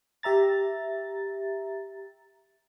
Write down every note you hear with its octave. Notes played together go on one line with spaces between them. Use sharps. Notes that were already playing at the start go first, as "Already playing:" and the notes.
G4 E5 A#5 A6